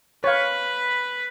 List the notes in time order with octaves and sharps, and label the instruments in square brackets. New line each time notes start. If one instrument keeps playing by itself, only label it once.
[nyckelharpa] B4 B5 [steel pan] C#5 F5